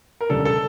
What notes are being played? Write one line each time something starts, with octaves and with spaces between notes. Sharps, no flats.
A#4
E1 D2 C#3 G3 D4 A4
A4